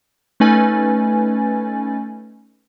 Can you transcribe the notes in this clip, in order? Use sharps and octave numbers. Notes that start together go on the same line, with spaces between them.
A3 C#4 D#4 B4 G#5 A6